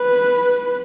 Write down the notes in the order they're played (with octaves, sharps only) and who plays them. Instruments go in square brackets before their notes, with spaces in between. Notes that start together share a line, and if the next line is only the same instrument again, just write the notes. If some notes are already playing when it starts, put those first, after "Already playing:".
Already playing: [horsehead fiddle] B4